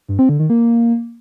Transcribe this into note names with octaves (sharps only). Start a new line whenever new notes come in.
G2
C4
D3
D#3
A#3